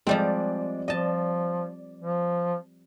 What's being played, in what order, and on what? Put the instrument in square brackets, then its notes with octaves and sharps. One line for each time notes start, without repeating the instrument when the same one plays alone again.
[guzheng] F3 G3 C4 [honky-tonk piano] G#3 D5
[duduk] F3 [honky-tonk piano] D5 [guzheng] D#5 A5
[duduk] F3